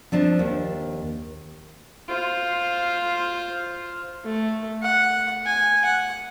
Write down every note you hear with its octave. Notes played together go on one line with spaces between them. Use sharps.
F3 C4 D4
D#2
F4 C5
A3
F#5
G#5
F#5